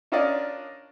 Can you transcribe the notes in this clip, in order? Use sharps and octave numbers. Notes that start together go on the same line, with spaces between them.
C#4 D4 F4 A#4 D5 D#5